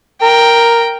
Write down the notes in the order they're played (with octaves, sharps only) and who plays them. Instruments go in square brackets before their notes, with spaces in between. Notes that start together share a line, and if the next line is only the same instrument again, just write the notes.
[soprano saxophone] A#4 [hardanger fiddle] G5